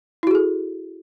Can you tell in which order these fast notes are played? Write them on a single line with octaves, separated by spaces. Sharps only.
E4 F#4 G#4 A4